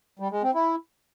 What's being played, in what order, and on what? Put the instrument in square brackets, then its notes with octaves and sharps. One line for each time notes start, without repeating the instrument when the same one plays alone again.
[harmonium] G3
G#3
C4
E4